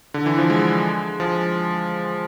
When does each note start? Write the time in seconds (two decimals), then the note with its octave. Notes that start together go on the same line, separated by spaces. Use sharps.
0.14 D3
0.26 E3
0.38 F3
0.50 G#3
1.20 F3